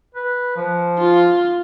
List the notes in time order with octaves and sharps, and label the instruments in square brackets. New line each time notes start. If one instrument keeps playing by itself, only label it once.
[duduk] B4
F3
[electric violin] F4